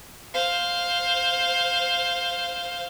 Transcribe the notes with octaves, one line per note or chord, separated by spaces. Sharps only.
C5 F5